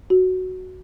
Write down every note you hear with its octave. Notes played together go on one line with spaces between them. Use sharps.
F#4